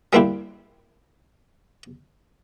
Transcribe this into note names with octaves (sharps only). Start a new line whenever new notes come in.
G3 A#3 C4 D4 E4 G4